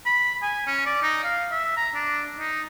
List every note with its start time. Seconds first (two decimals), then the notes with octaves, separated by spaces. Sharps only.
0.06 B5
0.42 G#5
0.67 C#4
0.86 D5
1.03 D#4
1.24 F5
1.51 E5
1.77 A#5
1.94 D4
2.38 D#4